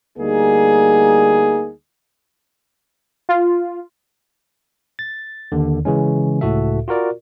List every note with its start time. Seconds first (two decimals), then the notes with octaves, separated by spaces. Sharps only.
0.18 D2 G3 A#3 D#4 G#4
3.29 F4
4.99 A6
5.52 D#2 D3
5.85 C#3 E3 G#3 C#4
6.41 C#2 A2 F#4 A4 E5
6.88 F4 F#4 A#4 D5